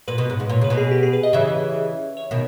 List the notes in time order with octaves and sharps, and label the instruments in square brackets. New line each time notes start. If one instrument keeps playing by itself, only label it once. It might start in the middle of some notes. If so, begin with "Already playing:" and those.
[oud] A#2 [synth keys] B4
[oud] B2
G#2
G#2
[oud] A#2 [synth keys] C#5
[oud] C#3 [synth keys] B4
[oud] B2
[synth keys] G#4
G4
G#4
B4
D#5
[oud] C#3 E3 [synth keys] E5
[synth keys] C#5
[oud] B2 D#3